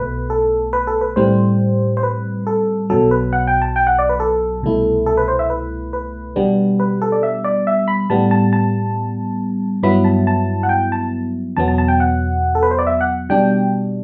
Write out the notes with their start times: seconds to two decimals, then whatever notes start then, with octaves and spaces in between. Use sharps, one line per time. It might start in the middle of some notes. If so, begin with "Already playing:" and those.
Already playing: B1 B2 A3 B4
0.30 A4
0.73 B4
0.87 A4
1.01 B4
1.16 A2 G3 C4 C5
1.97 C5
2.03 B4
2.47 A4
2.90 B1 B2 F#3 A4
3.11 B4
3.33 F#5
3.47 G5
3.62 A5
3.76 G5
3.87 F#5
3.99 D5
4.09 B4
4.20 A4
4.63 C2 B2 A3 E4
5.06 A4
5.17 B4
5.28 C5
5.39 E5
5.50 B4
5.93 B4
6.36 B2 G3 B3 D4
6.80 B4
7.02 A4
7.12 D5
7.23 E5
7.44 D5
7.67 E5
7.88 B5
8.10 A2 G3 B3 A5
8.31 A5
8.53 A5
9.83 G2 F#3 B3 E4 B5
10.04 A5
10.27 A5
10.63 F#5
10.69 G5
10.92 A5
11.56 E2 B2 F#3 B3 A5
11.68 A5
11.78 A5
11.88 G5
12.00 F#5
12.55 A4
12.63 B4
12.71 C5
12.79 D5
12.87 E5
13.01 F#5
13.29 B2 G3 D4 G5